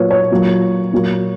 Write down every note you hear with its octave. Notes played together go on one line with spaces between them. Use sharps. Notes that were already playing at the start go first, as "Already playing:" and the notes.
Already playing: A#2 F#3 A#3 B4 C#5
C#5
A#2 F#3 A#3
A#2 F#3 A#3